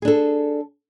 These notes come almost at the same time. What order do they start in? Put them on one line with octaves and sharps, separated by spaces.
G#4 D4 A4